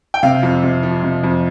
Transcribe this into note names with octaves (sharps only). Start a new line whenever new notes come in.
G5
C3 F5
F2
C3
F3
C3
F2